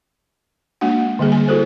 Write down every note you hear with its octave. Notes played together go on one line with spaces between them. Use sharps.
G#3 A#3 D4 F#4 F#5
D3 G3 A#3 G#4
G#5
E4 F#4 A4 C5